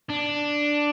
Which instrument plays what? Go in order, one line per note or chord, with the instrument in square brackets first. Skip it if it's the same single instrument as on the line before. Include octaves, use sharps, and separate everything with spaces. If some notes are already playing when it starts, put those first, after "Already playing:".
[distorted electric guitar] D4